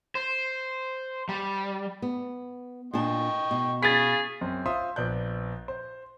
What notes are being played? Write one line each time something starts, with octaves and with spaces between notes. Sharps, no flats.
C5
G3
B3
A#2 D4 D#5 G5 A5 C#6
B2
G#4 F5 B5 C#6 A6 B6
F#2 C4
F4 C5 E5 C6 D#6
A#1 B3 D5 F#6 G6
C5